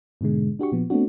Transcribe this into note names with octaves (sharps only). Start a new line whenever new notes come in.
G#2 B2 D3 G#3
D4 F#4 G4 C#6
A#2 F3 B3
A3 B3 C4 D4 F#4